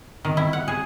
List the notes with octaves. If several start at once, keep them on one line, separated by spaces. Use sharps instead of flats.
D#3
E4
F#5
G#4